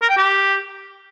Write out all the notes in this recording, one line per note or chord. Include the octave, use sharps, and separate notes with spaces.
A#4
G5
G4